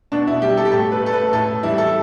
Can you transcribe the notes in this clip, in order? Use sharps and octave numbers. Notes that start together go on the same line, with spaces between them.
B2 D4
E4
G3 G4
A4
G4
A2 A4
B4
A3 A4
B4
A2 A4
E3 G3 E4
A4